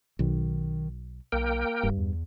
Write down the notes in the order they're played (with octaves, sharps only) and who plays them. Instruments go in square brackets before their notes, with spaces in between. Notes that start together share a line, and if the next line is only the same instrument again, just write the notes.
[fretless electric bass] B1 [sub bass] D#3
[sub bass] B1 [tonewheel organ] A#3 A#4 G5
[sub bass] D#1 [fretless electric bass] G2
[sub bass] E2